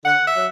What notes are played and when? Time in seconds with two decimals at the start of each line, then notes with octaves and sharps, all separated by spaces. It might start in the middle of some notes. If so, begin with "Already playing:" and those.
0.05 D3 F#5
0.25 E5
0.36 F#3